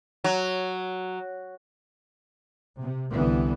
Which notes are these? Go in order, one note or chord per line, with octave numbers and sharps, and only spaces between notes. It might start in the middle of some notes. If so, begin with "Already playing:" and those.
F#3
C3
C2 D3 E3 G3 B3